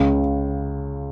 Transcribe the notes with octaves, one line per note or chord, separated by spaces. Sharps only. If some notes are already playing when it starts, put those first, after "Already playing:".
Already playing: C#2 C#3